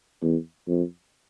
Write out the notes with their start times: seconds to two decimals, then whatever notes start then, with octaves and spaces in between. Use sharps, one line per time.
0.22 E2
0.68 F2